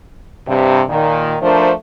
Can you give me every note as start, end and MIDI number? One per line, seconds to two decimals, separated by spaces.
0.47 0.82 43
0.47 0.82 48
0.89 1.36 46
0.89 1.36 51
1.42 1.71 53
1.42 1.71 57
1.42 1.71 62
1.42 1.71 70
1.42 1.71 72